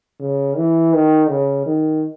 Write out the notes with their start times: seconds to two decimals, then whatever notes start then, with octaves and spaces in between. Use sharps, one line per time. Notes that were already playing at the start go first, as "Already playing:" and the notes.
0.20 C#3
0.57 E3
0.94 D#3
1.30 C#3
1.66 D#3